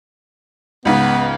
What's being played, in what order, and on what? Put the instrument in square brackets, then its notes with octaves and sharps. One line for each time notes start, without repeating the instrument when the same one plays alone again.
[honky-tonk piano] C#2 G#2 C#3 [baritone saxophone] B3